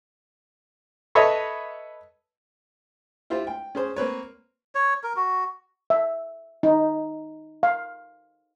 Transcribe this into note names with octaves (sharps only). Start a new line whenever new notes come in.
A4 B4 C#5 D#5 E5
E4 F4 G4 C5
G5
C#4 G#4 C5
A#3 C4 B4 C#5
C#5
A#4
F#4
E5
D#4
F5